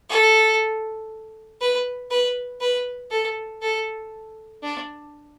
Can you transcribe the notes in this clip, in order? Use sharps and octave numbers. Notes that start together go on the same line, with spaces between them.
A4
B4
B4
B4
A4
A4
D4